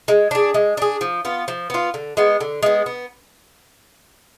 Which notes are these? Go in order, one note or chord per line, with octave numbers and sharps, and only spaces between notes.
G#3
D4 G#4
G#3
D4 G#4
F3
B3 F4
F3
B3 F4
D3
G#3 B3
D3
G#3 B3
B3